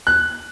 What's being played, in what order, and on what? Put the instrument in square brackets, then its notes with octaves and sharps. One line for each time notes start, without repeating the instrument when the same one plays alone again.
[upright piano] F#6